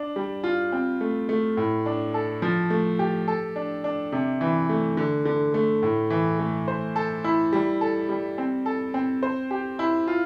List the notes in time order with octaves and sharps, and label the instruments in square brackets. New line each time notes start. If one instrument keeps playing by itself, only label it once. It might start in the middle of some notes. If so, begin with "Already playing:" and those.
Already playing: [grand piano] D4
G3
F4
C4
A3
A3
A2
D4
A4
F3
A3
G4
A4
D4
D4
C3
E3
A3
D3
D3
A3
A2
E3
A3
C5
A4
E4
G3
A4
G3
C4
A4
C4
C5
G4
E4
F4